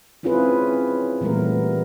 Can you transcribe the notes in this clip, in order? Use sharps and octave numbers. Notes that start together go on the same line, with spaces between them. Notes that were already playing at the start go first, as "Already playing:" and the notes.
C4 C#4 E4 F4 G#4 B4
A#2 E3 G3 A3 B3 A#4